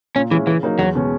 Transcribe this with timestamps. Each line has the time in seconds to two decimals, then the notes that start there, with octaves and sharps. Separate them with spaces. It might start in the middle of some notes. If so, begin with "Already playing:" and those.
0.15 A#2 C#4
0.31 E3 G#3 C#4 E4
0.47 C#3 E3
0.63 F#3 A#3 D#4
0.79 E2 F#3
0.95 B2 G#3 C#4